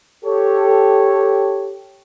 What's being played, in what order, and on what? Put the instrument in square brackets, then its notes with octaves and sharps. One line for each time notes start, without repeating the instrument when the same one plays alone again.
[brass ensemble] G4 A4 C#5